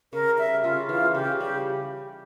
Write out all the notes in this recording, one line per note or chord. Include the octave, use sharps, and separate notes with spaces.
C#3 A#4
G3 E5
C#3 F4
E3 F4
C#3 G4
G3 G4